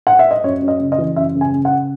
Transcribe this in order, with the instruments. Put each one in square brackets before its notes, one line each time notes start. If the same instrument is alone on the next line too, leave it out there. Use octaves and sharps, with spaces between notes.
[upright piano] F#5
E5
D#5
F#2 C#5
F#2
D#5
C#3
D#5
E3
F#2 E5
C#3
G#5
C#3
F#5